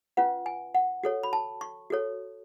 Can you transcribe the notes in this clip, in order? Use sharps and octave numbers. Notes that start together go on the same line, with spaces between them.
C#4 F4 B4 F#5
G#5
F#5
F#4 A4 C#5
B5
A5
C#6
F#4 A4 C#5